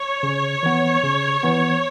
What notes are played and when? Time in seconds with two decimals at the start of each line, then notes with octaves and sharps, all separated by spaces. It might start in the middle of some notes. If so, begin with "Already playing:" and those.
Already playing: C#5
0.23 C#3
0.63 E3 B3
1.03 C#3
1.43 E3 B3